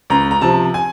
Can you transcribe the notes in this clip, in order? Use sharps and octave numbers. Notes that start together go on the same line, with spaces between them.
C#2 A#5
A#5
C3 F3 A5
G#5